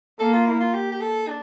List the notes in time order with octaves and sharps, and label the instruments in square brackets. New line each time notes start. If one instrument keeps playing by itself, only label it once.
[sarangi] A#3 [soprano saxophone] A4
[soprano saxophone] F4
E4
F4
G4
G4
A4
D4